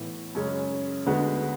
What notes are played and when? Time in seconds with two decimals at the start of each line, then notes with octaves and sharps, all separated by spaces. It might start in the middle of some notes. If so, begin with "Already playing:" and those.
Already playing: A2 E3 B3 E4
0.35 F#2 C#3 G#3 C#4
1.06 D2 D3 G#3 B3 F#4